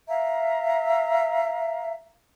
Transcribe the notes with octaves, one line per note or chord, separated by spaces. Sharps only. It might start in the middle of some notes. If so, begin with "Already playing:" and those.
E5 F5 A#5